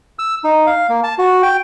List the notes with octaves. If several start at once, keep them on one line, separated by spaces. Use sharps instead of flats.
E6
D#4
F5
A#3
A5
F#4
G5